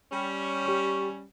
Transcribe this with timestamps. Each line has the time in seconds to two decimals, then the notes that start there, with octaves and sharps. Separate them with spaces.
0.12 G3 C#4
0.66 G4 C#6